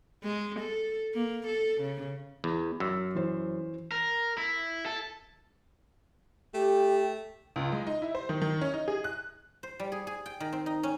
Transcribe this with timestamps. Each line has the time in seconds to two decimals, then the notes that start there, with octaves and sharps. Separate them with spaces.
0.24 G#3
0.60 A4
1.14 A#3
1.47 A4
1.81 C#3
2.44 E2
2.80 F#2 E6
3.15 E3 C5
3.92 A#4
4.38 E4
4.86 A4
6.54 A3 G4 G5
7.56 C#2
7.72 G#3
7.87 D#4
8.02 E4
8.15 C5
8.29 D#3
8.42 D#3
8.61 C#4
8.73 D#4
8.88 G#4
9.04 F#6
9.63 C5
9.80 G3
9.92 G#4
10.07 G#4
10.26 G5
10.40 D#3
10.53 C4
10.66 D#4
10.83 C#4